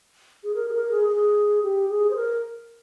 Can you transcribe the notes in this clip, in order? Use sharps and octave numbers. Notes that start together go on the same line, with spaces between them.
G#4
A#4
G#4
A#4
G#4
G#4
G4
G#4
C5
A#4